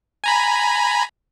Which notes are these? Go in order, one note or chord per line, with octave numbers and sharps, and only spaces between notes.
G#5 A#5 B5